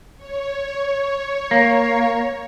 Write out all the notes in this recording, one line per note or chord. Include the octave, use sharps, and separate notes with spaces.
C#5
A#3